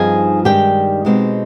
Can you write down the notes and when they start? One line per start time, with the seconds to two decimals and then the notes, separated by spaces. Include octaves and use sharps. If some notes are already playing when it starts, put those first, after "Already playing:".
Already playing: G2 F3 C4 D#4 G#4 G#5
0.45 G2 D#3 G#3 D4 G4 G5
1.05 B2 G#3 C4 D#4